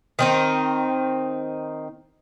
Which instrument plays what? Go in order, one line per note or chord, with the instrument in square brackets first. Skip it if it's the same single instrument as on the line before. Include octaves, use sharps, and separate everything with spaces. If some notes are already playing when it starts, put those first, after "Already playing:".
[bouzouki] D#3 C4 D#4